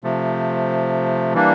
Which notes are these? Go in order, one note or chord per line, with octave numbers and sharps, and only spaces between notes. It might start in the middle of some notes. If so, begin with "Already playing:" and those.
C3 F3 A3
E3 G3 A#3 D4